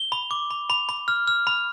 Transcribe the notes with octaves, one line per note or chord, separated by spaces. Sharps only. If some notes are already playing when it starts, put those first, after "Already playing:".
Already playing: G7
B5
D6
B5
B5
B5
F6
F6
B5